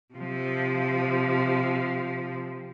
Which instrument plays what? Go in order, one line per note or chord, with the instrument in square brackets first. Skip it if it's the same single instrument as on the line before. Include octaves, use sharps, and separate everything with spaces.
[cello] C3 F3